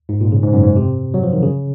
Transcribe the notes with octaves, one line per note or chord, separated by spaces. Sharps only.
G#2
A#2
C#3
G#2
F#2
G#2
C3
F#3
F3
D#3
C#3